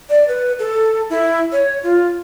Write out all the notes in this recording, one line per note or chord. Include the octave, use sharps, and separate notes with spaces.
D5
B4
A4
E4
C#5
F4